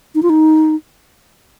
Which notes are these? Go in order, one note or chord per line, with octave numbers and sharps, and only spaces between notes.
D#4
F4
D#4